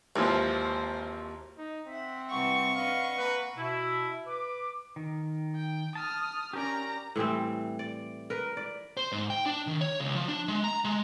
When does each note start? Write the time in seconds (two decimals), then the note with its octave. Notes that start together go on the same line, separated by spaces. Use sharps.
0.16 G#1 D#2 E3 F3 C5
1.58 D#4
1.87 C4 E5 F#5
2.30 C3 E3 G3 F#5 C#6
2.75 D4 B4 D#5 F5
3.17 A#3 B4
3.57 B2 E4
4.27 B4 D6
4.96 D#3
5.55 G5
5.95 A5 D#6 F6
6.53 C#4 G4 A#4 D5 A#5
7.16 A2 E3 G3 C4
7.79 D5
8.30 A#4 B4
8.57 D5
8.97 C5
9.12 G#2
9.30 G5
9.46 D4
9.67 D#3
9.81 C#5
10.00 C#2
10.16 F3
10.28 D4
10.48 G#3
10.64 A#5
10.85 G#3